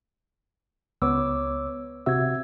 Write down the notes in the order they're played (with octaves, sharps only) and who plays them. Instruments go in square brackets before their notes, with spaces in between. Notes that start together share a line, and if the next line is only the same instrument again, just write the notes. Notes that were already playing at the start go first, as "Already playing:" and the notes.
[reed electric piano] C#2 B3 [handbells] C#5 D6 E6
[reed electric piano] C3 F#4 E5 [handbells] E6 G#6